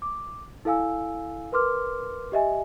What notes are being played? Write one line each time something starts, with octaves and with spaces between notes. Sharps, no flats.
D6
E4 A4 F5 G#5 E6
A#4 B4 C6 D6 F6
G4 D#5 E5 G#5